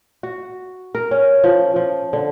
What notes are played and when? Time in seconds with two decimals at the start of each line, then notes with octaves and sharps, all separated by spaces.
0.23 F#4
0.95 A#4
1.11 C#4
1.44 F3
1.76 F3
2.13 D3